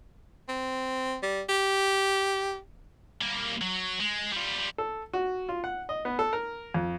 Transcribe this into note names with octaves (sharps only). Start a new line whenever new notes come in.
C4
G3
G4
G3 A#3
F#3
G#3
G3 F4
A4
F#4
F4
F#5
D#5
B3
A4
A#4
F2